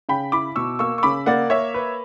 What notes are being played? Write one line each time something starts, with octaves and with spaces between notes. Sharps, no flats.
C#3 G5 B5
E4 B5 D6
B2 C#6 E6
A#3 C#6 E6
C#6
C#3 B5 D6
A#3 D5 F#5
A#3 C#5 E5
B4